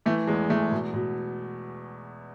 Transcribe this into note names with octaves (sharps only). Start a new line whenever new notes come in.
E3 A3
E2 G#3
E2 A3
B2
B2